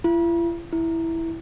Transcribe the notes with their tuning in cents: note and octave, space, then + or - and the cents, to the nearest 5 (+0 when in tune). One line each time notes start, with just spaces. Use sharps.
E4 +45
E4 +0